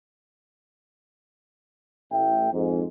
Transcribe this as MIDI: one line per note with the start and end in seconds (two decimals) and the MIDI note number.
2.11 2.50 33
2.11 2.50 45
2.11 2.50 76
2.11 2.50 79
2.52 2.84 41
2.52 2.84 44